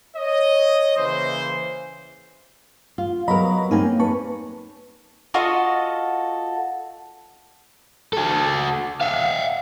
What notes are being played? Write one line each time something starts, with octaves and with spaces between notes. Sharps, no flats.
C#5 D#5
C#3 E3 A#3 C5
F4
F#3 B3 A#4 D#5 A#5 B5
A#3 C4 C#4 D#4 G#5
B4 A5 C#6
F4 F#4 A4 D#5
F#4 A4
E5 F5